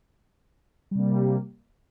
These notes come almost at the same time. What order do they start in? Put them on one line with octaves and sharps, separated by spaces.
G3 C3 A#3